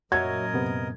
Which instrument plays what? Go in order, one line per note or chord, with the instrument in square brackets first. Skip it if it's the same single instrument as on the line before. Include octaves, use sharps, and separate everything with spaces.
[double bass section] F#2 A#2 [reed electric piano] F#4 C#5 E5 [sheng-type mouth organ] A#4 D#5 [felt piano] G#6
[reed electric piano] C3 B3